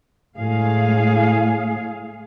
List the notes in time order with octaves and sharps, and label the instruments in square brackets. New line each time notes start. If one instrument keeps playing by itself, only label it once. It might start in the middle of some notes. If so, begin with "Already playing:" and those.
[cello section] A2 G#3 G#4 F5